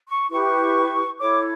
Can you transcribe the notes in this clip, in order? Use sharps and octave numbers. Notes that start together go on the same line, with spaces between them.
C#6
E4 G4 B4 C#6
E4 A4 C#5 D6